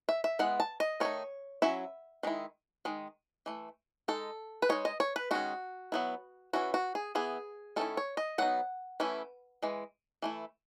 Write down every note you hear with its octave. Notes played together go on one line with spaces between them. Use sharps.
E5
E5
G#3 B3 E4 F#5
A5
D#5
D#3 A3 D#4 C#5
F#3 C#4 E4 E5
D#3 G#3 E4
D#3 G#3
E3 A3
G#3 D#4 A4
B4
G#3 D#4 C#5
D#5
C#5
B4
D#3 G#3 C#4 F#4
F#3 B3 E4
E3 A3 C#4 E4 F#4
F#4
G#4
E3 B3 E4 G#4
D#3 A3 C#4 E4 A4
C#5
D#5
F#3 B3 D#4 F#5
E3 A3 C#4 E4
E3 G#3
E3 A3 E4